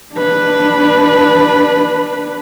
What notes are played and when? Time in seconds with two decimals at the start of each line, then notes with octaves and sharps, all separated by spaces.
0.15 D4 B4